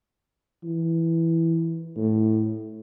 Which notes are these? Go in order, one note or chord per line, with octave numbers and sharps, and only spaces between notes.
E3
A2